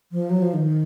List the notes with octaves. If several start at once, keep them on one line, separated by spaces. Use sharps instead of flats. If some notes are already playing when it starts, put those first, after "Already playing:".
F3
F#3
F3
D#3